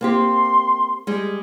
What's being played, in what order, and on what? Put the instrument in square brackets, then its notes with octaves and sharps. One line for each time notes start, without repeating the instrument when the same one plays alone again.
[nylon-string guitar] A#3 C4 G4 [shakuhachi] C6
[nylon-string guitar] G3 G#3